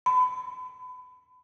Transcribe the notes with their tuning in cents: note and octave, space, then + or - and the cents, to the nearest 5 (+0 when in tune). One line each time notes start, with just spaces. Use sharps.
B5 +30